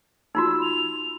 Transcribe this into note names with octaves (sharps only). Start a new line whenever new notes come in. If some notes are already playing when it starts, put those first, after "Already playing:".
D#4 F4 F#4 E6
F7